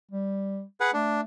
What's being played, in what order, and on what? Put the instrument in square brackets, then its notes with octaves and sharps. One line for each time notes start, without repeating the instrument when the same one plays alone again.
[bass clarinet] G3
[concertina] G#4 B4 F#5
[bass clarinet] A3 [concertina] D4